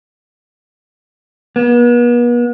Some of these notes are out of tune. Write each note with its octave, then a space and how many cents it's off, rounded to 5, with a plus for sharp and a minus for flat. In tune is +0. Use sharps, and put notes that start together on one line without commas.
B3 -40